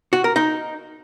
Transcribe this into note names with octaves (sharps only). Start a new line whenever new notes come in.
F#4
A#4
D#4